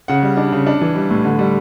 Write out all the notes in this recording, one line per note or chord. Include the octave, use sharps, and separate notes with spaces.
C#3 F#5
G3
D4
C#3
D4
E3
G3
A2
D3
G3